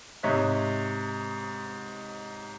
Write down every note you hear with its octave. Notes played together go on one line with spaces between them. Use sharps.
G#2 C3 C#5 D#5 E5 F#6